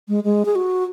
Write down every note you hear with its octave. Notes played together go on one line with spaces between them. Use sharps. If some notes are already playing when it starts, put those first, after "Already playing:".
G#3
G#3
G#4
F#4